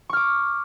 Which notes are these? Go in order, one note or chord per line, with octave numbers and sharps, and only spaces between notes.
C#6 D6 F6